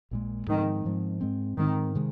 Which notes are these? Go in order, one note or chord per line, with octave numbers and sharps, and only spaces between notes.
A#1 A#2 G#3
G#2 D#3 F3 G#3 C4
G#2 F3 G#3 C4
G#2 G#3 C4
G#2 D#3 G#3 C4
C3 D#3 G#3